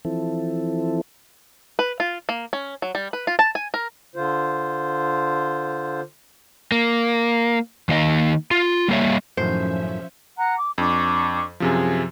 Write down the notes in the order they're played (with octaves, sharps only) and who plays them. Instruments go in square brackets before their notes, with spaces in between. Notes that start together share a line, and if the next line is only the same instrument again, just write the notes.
[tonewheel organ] E3 F3 C4 E4 A4
[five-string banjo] B4
F4
A#3
C#4
F#3
G3
B4
F4
A5
G#5
A#4
[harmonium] D3 F4 C5
[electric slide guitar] A#3
D#3 A#3 D#4 D#5 F#5 A#5
F4
G3 A#3 C#5 E5
[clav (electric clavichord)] F#2 A2 D#3 [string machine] F3 C#4 E5 [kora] C5
[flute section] F#5 A#5 F#6
D6
[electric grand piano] F2 [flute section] D4 C#6
[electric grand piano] F#2 C3 F3 [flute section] G#4